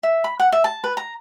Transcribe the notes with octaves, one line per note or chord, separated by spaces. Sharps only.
E5
B5
F#5
E5
A5
B4
A#5